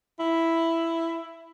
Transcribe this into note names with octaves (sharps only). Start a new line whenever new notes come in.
E4